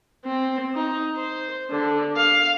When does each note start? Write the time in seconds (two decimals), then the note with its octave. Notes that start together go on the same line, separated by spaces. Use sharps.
0.25 C4
0.75 D#4
1.16 C5
1.71 D3
2.17 F5